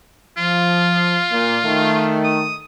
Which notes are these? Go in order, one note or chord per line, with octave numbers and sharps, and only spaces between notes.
F3 F4
A#2
D#3 A3
D#6